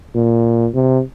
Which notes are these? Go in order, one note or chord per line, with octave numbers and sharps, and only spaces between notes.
A#2
C3